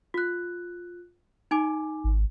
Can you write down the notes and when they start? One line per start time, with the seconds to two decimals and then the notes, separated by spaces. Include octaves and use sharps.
0.14 F4 F#6
1.51 D#4 G#5 D6
2.04 G#1